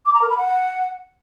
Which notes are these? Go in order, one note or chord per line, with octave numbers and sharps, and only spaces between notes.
D6
A#5
A#4
B5
F#5